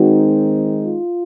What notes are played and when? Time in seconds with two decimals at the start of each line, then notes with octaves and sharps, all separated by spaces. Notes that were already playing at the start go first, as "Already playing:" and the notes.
Already playing: D#3 G#3 C4 D#4 F#4
0.84 F4